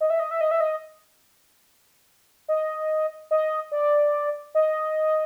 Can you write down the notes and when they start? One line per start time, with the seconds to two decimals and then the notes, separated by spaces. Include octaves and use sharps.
0.01 D#5
0.10 E5
0.20 D#5
0.31 E5
0.41 D#5
0.51 E5
0.60 D#5
2.48 D#5
3.31 D#5
3.72 D5
4.55 D#5